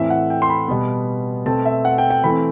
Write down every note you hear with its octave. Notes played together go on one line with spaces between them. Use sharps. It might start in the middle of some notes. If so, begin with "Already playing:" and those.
Already playing: A2 E3 A3 C4 E5
F#5
G5
C6
B5
B2 G3 B3
B2 A3 C4 A5
E5
F#5
G5
G5
E3 A3 C4 B5